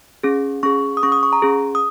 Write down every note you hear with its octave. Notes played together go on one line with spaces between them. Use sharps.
C#4 G#4
C#4 G#4 C#6
D#6
C#4 G#4 C#6
D#6
C#6
A#5
C#4 G#4
D#6